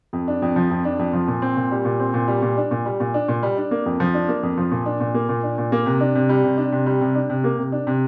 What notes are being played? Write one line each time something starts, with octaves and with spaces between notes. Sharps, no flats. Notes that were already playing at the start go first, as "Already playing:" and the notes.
F2
D4
F2
F3
F2
D4
F2
F3
A#2
C4
A#2
G3
A#2
C4
A#2
G3
A#2
D4
A#2
G3
A#2
D4
A#2
G3
D4
A#3
F2
F3
D4
A#3
F2
F3
A#2
D4
A#2
A#3
A#2
D4
A#2
A#3
C3
D4
C3
G3
C3
D4
C3
G3
C3
D4
C3
A#3
C3
D4
C3